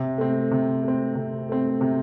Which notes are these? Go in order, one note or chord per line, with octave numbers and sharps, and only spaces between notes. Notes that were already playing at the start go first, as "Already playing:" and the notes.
Already playing: C3
A3 C4
C3
A3 C4
C3
A3 C4
C3